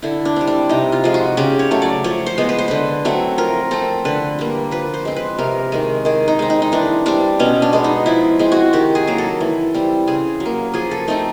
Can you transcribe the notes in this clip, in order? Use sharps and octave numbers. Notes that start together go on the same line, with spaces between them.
D3 E4
D4
G3 C4
D4
C3 D#4
F4
F3 G#3
F#4
C#3 G4
C#5
F#3 A3
D5
F3 C#5
C5
G#3 B3
B4
C5
D3 B4
F#3 A3 C4
F3 A#4
A3 C4 A4
D3 B4
G3 A#3
F3 B4
C5
G#3 C4
B4
C3 A#4
D#3 G#3
D#3 G#4
D#4
G#3 C4
D#4
D#4
E3 D4
G3 C4 D4
B2 C#4
D4
G#3 B3
D#4
F3 E4
G#3 C4
F#4
D#3 G4
G#4
F#3 A#3
A4
E3
G3 C4
C#3 G#4
F#3
A#3
F3 G#4
A4
A3 C4 D#4